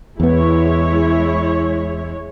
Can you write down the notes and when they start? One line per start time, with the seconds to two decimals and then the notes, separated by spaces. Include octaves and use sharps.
0.20 E2 G#3 B3 E4 C#5